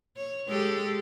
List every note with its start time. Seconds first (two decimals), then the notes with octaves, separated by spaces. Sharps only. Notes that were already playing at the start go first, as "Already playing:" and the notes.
0.17 C#5
0.48 G#3 G4 A4